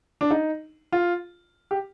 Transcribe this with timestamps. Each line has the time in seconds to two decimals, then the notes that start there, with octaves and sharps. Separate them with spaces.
0.21 D4
0.31 D#4
0.92 F4
1.71 G4